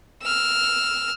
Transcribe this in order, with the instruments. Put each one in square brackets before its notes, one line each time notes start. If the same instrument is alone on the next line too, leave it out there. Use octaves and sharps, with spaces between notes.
[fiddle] E6 F6